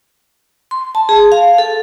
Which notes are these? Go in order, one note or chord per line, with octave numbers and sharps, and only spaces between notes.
C6
A5
G#4
F5
A4